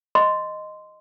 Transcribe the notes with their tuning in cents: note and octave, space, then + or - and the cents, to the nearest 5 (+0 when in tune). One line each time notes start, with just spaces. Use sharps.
D#5 -5 C6 -10